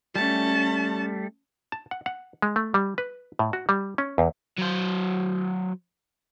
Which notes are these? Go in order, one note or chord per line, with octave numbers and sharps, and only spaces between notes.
G3 A3 C#4 A5
A5
F#5
F#5
G#3
A3
G3
B4
A2
F#4
G3
C#4
E2
F#3 C5